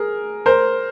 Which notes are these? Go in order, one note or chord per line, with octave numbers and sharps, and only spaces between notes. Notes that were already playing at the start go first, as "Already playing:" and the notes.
Already playing: G#4 A#4
A#4 C5